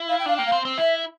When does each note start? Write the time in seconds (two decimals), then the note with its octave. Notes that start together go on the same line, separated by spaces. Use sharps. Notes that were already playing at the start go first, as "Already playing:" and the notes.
Already playing: E4
0.09 F5
0.19 G5
0.26 D4 F5
0.36 A#3 G5
0.46 F5
0.52 C4
0.65 C4
0.78 E4 E5